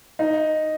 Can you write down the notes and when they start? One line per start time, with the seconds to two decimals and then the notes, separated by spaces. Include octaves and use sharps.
0.19 D#4